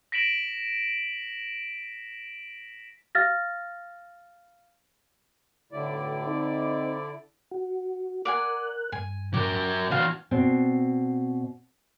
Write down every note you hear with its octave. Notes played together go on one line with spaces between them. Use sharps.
A#6 B6 D7 E7 F#7
F5 F6 A6 A#6
B1 A2 D3 E4 D5
C4 D#4
F#4
A#4 D5 F#5 G#5 F#6
G2 G#5
F#3 G4 A#4
E3 D4 F#4 F5 G#5 A5
B2 C4 D4